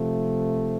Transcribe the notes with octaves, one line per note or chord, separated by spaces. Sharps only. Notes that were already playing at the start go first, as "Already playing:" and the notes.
Already playing: C3 F3 A3